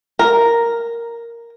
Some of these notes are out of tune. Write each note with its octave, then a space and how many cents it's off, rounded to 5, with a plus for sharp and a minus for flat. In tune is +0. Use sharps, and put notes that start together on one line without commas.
A#4 +0